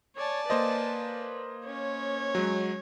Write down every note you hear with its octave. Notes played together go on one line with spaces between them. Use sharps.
C#5 D5 G#5 A5
A#3 B4 C5 D#5
C#4 C#5
F#3 G#3